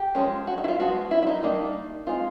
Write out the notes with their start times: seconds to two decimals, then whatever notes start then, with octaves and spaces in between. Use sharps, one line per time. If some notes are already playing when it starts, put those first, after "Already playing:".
Already playing: G4
0.15 F3 G#3 C#4
0.47 F#4
0.58 D#4
0.64 E4
0.68 F4
0.80 F3 G#3 B3 F#4
1.11 E4
1.22 E4
1.27 D#4
1.43 D#3 G3 A#3 D4 D#4
2.06 G#3 C4 D#4 F4